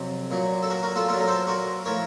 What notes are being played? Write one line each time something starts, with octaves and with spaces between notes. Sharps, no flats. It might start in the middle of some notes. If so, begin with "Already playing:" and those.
Already playing: F2 C3 F#3
A#2 F#3
A4
F#4 A#4
F#4 A#4
F4 A4
A#2 F#3 F4 A4
A#4
A4 C5
F#4 A#4
A2 F3 A#4 C#5